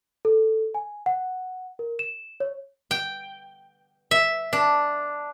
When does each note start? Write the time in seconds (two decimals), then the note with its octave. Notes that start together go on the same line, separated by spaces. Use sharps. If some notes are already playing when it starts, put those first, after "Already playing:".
0.25 A4
0.75 G#5
1.06 F#5
1.79 A#4
1.99 E7
2.40 C#5
2.91 G5
4.11 E5
4.53 D4